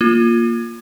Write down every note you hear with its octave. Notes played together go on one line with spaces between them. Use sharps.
A#3 F4